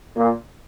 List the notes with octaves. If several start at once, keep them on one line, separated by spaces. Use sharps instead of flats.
A#2